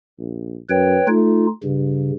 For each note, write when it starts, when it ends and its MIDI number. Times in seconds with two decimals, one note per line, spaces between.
0.19 0.57 34
0.70 0.99 42
0.70 1.07 71
0.70 1.07 73
0.70 1.07 79
1.08 1.49 57
1.08 1.46 63
1.08 1.46 65
1.63 2.17 43
1.63 2.11 49